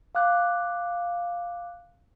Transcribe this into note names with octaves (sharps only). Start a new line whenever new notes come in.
F5 D6 F#6